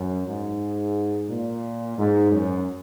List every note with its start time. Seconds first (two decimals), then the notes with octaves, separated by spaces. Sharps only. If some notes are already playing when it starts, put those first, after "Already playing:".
Already playing: F#2
0.27 G#2
1.29 A#2
1.98 G#2
2.32 F#2